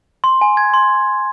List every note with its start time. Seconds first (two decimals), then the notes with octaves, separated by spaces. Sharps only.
0.24 C6
0.41 G#5
0.57 G#6
0.74 C6